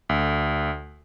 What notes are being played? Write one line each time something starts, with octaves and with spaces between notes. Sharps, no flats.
D2